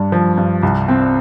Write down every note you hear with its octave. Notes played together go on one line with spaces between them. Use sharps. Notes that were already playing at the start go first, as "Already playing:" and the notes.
Already playing: G2 D4
F3
G2
C2
C4